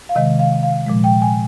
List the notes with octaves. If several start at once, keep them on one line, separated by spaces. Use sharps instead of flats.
F5
C3 D#3 G#3 D#5
F5
F5
A#2 F3 G#3
G5
G#5